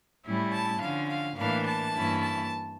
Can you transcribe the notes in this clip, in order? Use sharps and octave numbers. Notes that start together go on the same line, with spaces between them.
A2 G3 C#4 E4
A5
D3 F3 C#4 F5
F5
A2 E3 A#3 D4 F5
A5
G2 E3 A#3 C#4 E4
A5